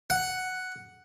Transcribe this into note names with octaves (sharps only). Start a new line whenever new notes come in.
F#5